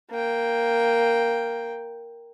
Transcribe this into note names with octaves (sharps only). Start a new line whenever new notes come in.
A#3 G5